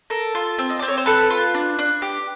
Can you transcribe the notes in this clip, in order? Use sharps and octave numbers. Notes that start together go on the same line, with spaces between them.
A4 A#4
F4
C4
D#5
C4 D5
C#5
C5
A4 B4
F4
D4
D4
G4